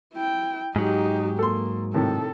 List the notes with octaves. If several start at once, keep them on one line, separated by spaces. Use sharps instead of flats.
E4 G5
G#2 F#3 D#4 G4
A#3 A4 C6
A2 C3 D#3 A4